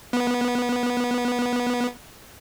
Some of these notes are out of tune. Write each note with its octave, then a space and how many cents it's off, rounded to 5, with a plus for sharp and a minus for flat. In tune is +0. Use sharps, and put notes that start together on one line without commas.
B3 -20